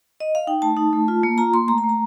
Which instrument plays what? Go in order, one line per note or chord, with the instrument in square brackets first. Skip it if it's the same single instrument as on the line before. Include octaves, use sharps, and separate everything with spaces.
[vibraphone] D#5
F5
D#4 G5
A3 A5
D#4
A3
F4
A#3
F4 A#5
A#3 C6
A3 A#5
A#5
A3
A#5